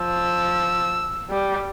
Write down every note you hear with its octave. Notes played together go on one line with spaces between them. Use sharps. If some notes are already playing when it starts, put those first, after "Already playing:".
Already playing: F3 E6
G3